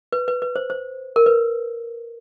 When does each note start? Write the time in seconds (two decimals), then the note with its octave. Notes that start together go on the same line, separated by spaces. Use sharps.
0.13 B4
0.28 B4
0.42 B4
0.56 C5
0.70 C5
1.16 A#4
1.26 B4